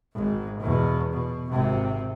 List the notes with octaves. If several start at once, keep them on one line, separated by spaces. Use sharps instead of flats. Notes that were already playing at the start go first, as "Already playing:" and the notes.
G#1 G#2
E2 B2
B2
G#1 C3